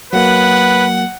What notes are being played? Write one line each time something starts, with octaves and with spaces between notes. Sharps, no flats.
F#3 A#3 B4 F#5